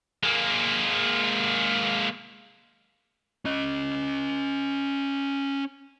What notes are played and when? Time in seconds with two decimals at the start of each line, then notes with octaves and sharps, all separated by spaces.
0.23 G#3 A#3
3.45 C#4 D#5